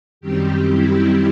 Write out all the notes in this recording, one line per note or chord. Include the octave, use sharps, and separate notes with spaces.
F#2 D#3 G3 C4 G4
E4